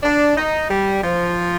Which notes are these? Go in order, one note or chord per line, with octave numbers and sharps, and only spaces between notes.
D4
D#4
G3
F3